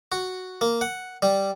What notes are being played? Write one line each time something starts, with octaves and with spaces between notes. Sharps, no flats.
F#4
A#3
F#5
G3